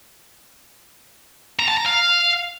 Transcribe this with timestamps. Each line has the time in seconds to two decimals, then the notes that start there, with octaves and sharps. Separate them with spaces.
1.60 A#5
1.68 A5
1.77 A#5
1.86 F5